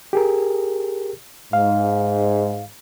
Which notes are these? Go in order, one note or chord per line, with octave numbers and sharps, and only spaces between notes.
G4 G#4 A#4
G#2 F5